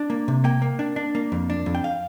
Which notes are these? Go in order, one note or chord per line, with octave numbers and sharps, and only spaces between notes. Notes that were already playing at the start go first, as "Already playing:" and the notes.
Already playing: D4
A#3
C3
A#3 G5
A#3
D4
D4
A#3
F2
D4
F2
G5
F5